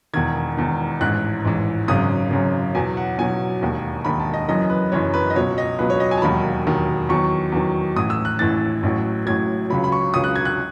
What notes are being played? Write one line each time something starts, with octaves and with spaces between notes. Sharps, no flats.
E1 E2 D#3 G#6
E1 E2 D#3
A1 G#2 E3 F#6
A1 G#2 E3
G#1 F#2 C#3 D#6
G#1 F#2 C#3
E2 B2 F#3 G#5
F#5
E2 B2 F#3 G#5
E1 D#2 D#3
E1 D#2 D#3 B5
A5
D#5
F#1 F#2 E3 D#5
B4
F#1 F#2 E3 C#5
B4
D#5
C#2 B2 F#3 C#5
D#5
C#2 B2 F#3 B4
C#5
D#5
G#5
A5
E1 D#2 D#3 F#3 B5
E1 D#2 D#3 F#3
E2 D#3 F#3 C#6
E2 D#3 F#3
A1 A2 E3 D#6
E6
F#6
A1 A2 E3 A6
A1 A2 F#3
A1 A2 F#3 G#6
C#2 C#3 F#3 B5
B5
C#6
C#2 C#3 F#3 D#6
F#6
G#6
F#6